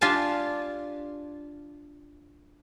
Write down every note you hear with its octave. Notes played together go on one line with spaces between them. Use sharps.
D4 F4 G4 F5 G#5 A5